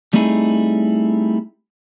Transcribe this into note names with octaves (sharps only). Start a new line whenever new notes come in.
G3 A3 C4 D#4 E4 G#4